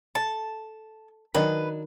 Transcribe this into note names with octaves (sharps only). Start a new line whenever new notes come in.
A4 A5
D#3 F#3 D4 B4 D#5